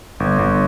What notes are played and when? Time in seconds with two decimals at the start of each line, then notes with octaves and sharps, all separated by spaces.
0.20 G1
0.39 G1